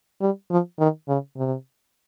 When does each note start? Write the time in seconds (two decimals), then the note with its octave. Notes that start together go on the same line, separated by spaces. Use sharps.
0.21 G3
0.50 F3
0.79 D#3
1.08 C#3
1.37 C3